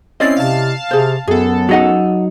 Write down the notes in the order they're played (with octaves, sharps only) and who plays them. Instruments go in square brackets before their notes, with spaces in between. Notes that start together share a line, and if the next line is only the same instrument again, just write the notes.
[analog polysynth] C4 C#4 C7 [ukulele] E4 D5 D#5
[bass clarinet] C3 [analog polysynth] F5 A5
[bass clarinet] C3 [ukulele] G#4 C5
[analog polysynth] F#2 A4 [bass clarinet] B3 [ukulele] G#4
[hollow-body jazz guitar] F#3 D#4 [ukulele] G#4 D#5 F#5